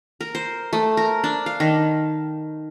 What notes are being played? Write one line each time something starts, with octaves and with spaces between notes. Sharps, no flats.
A#4
C5
A3
A#4
D4
F5
D#3